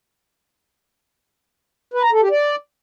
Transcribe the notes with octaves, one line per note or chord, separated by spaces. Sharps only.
B4
A#5
A4
G4
D5